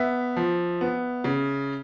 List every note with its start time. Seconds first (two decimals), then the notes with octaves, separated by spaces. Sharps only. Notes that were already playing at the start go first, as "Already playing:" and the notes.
Already playing: B3 E5
0.36 F3
0.81 B3
1.24 C#3